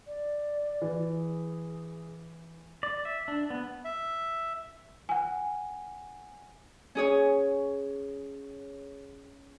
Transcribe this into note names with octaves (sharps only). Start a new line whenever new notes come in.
D5
E3
G#4
D5
E5
D4
B3
E5
F#5 G#5
C#4 G#4 C#5